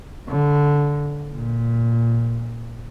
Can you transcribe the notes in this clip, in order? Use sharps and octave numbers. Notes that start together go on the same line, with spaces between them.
D3
A#2